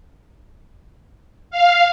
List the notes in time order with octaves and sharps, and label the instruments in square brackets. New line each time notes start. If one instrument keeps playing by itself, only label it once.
[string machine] F5